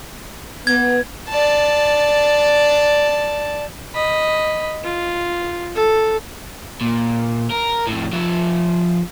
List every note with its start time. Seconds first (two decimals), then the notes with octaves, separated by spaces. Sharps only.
0.67 B3 G#6
1.29 D5 A5
3.95 D#5 B5
4.84 F4
5.75 A4
6.81 A#2
7.51 A#4
7.87 F2 A2
8.13 F3 E5